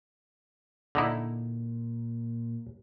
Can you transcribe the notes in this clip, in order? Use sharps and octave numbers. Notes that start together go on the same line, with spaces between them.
A#2 D3 D#4 E4